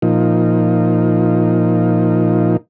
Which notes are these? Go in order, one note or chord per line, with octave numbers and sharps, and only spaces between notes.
A#2 F3 D#4